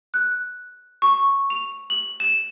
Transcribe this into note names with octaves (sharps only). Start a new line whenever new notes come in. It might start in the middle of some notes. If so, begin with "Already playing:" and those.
F#6
C#6
F7
F#7
E7